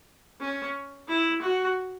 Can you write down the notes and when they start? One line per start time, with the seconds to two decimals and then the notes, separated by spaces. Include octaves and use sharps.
0.41 C#4
1.08 E4
1.42 F#4